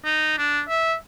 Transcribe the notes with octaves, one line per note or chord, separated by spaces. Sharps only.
D#4
D4
E5